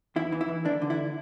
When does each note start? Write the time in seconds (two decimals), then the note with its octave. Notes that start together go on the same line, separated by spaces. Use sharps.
0.16 E2 E4
0.32 E3
0.41 E4
0.48 E3
0.65 D2 D4
0.82 D3
0.90 E4